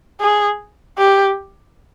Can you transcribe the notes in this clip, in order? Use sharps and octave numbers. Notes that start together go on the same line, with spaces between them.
G#4
G4